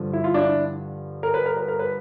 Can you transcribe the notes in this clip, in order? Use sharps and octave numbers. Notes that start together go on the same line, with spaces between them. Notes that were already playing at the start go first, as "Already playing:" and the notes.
Already playing: G2 D3 F3
E4
F4
D4 E4
A#4
B4
A#4
B4
A#4
B4